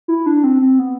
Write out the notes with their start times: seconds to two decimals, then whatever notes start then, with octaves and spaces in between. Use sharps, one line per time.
0.08 E4
0.26 D4
0.44 C4
0.62 C4
0.79 B3